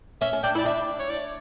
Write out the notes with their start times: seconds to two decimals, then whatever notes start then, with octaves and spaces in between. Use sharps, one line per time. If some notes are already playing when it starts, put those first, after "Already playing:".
0.21 C#4 E5
0.33 C#4
0.44 D4 G5
0.55 E4 D5
0.65 D4 E5
0.99 C#5
1.10 D5